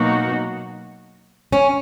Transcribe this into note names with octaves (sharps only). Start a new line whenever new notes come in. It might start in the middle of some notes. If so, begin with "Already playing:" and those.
Already playing: B2 F#3 A#3 D#4 F#4
C#4